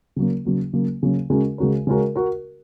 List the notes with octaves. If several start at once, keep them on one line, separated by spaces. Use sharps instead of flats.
C#3 F#3 A#3
C#3 F#3 A#3
C#3 F#3 A#3
C#3 F#3 A#3
C#3 G#3 C#4 F#4 A#4
C#3 G#3 C#4 F#4 A#4
C#3 G#3 C#4 F#4 A#4
F#4 A#4